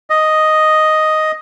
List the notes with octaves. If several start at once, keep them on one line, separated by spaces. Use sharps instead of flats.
D#5